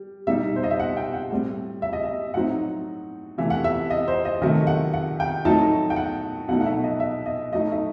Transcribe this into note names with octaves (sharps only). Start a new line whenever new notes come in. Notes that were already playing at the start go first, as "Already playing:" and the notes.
Already playing: G3
B2 G3 D#4 E5
C5
D#5
E5
F#5
G5
F#5
A2 G3 C4
E5
D#5
E5
A2 F#3 C4 D#4 F#5
C3 E3 A3 E5
F#5
E5
D#5
C5
D#5
C3 D#3 F#3 A3 D#5
F#5
F#5
G5
A2 F#3 A3 C4 D#4 A5
G5
F#5
B2 F#3 A3 D#4 F#5
F#5
E5
D#5
E5
D#5
A2 F#3 A3 D#4 D#5
E5